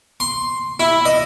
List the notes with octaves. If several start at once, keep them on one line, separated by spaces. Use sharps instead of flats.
C6
E4
D#5